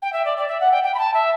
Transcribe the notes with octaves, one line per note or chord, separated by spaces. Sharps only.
G5
E5
D5
D5
E5
F#5
G5
G5
B5
A5
E5